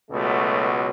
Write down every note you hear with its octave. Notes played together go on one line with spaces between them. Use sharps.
C#2 B2 F#3 A3